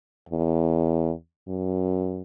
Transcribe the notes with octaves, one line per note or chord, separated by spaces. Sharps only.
E2
F#2